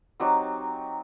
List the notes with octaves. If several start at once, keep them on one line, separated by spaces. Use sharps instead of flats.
F#3 C4 D#4 G4